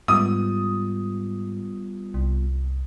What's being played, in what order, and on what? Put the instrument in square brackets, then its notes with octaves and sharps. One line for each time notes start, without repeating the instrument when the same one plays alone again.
[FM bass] G#2 [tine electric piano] G3 B3 F4 [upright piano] D#6
[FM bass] C2